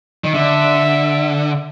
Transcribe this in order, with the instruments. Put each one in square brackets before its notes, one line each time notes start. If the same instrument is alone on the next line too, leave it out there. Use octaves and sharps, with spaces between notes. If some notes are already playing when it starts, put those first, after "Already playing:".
[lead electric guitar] D#3
[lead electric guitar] D3 [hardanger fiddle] E5